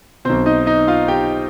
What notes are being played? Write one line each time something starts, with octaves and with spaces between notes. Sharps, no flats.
B1 B2 C4 C5
D#4 D#5
D#4 D#5
F4 F5
G4 G5